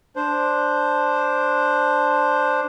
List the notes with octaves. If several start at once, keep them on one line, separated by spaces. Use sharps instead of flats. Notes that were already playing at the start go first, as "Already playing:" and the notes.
D4 C5